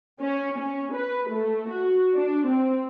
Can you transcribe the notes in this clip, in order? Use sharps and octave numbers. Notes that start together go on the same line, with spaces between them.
C#4
C#4
B4
A3
F#4
D4
C4